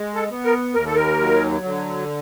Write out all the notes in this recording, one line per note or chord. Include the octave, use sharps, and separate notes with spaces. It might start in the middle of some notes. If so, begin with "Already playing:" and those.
Already playing: G#3
A4
B3
A#4
D#2 A#4
A4
A#4
F#3
D3